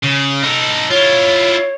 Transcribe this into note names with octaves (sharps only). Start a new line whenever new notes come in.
C#3
D#4 A4
E4 F4 C#5